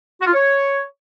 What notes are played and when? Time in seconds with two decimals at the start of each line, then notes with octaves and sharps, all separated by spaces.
0.20 F#4
0.27 F4
0.33 C#5